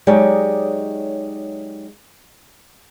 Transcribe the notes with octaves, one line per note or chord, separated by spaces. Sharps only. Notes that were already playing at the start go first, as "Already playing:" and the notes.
F#3 G#3 D#4 G4 C#5 D5